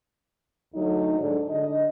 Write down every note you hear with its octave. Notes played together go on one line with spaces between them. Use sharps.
D2 F#3 A3 D#4
G#2 D3
D3 D#5